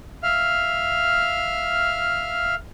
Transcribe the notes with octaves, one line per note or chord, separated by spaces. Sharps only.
E5 F5 F6